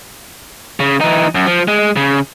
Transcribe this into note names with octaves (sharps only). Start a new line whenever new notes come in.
C#3
E3 D#4
F#2
F3
G#3
C#3